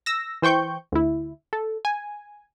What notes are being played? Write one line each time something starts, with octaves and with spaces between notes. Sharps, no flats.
E6 A#6
E3 C5 G5 C#6 G6
D2 E4
A4
G#5